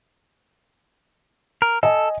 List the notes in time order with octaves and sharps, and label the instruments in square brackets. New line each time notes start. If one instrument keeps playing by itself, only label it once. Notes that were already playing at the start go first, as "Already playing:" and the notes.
[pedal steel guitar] A#4
[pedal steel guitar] A4 [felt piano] D#5 G#5